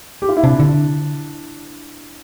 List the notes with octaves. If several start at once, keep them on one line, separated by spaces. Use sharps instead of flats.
G4
F4
E4
C3 D4
D3